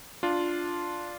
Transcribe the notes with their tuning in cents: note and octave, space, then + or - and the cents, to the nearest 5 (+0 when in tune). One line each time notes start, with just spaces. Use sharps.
D4 +0 F4 +0